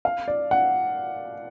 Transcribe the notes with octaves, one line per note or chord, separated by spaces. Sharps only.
F5
D5
F#5